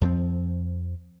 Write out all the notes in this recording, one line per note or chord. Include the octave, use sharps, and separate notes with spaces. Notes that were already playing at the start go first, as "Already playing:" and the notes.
F2 F3 B3 C4